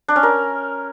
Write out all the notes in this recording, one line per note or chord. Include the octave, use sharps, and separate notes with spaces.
D4
C#4
A#4